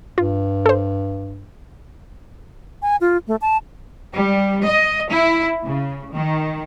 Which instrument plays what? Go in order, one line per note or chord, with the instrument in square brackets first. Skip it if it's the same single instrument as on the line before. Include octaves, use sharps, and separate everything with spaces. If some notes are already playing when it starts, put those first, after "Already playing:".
[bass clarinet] G2 [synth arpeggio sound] F4
[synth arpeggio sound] A4 C5
[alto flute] G#5
F4
A3
A5
[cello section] G3
D#5
E4
C#3
D#3